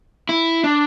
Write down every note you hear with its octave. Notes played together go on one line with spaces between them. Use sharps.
E4
D4